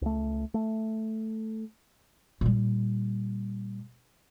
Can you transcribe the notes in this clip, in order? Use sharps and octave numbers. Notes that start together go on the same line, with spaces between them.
C#2 A3
A3
A#2 G3